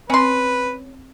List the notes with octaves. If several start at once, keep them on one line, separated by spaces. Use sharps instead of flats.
C4 C#4 B4 C6